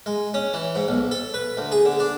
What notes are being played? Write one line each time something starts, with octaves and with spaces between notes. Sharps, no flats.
G#3
C#4
E3
G#2
B1
A4
B4
D2
G#4
D3
D4